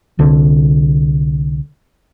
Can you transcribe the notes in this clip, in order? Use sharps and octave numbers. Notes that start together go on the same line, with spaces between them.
C2 D3